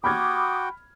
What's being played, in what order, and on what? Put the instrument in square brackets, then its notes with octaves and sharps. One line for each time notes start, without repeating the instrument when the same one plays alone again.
[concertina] F#4 G5 [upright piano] B5 F6 G#6 [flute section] D6 D#6